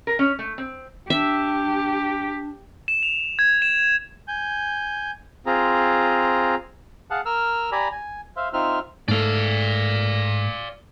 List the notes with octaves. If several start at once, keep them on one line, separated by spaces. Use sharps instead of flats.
A#4
C#4
A3
C4
D4 G4 E5
E7
F7
G#6
E7
G#5 G6
C4 F4 G#4 A#5
G#4 F5 F#5 A5
A#4 E6 F6
G4 D5 G#5 A#5 B5
G#5
C5 E5 F5
C4 D#4 F4 C5 E5 F6
G#2 A3 D5 F5